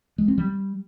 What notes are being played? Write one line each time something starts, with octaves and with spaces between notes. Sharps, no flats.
G#3
C4
G3